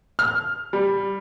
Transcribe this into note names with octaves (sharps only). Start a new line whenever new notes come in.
F6
G3